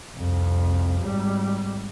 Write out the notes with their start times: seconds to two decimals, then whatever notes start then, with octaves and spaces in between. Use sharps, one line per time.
0.15 C2 F2
1.01 G#1 G3